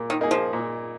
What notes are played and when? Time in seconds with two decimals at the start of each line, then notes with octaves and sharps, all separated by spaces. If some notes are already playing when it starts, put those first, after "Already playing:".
Already playing: A#2 A#3
0.10 D#3
0.21 A#3 D#4 G#4
0.31 F3
0.53 A#2